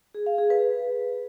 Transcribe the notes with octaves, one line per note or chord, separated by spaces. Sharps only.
G#4
F5
G#4
B4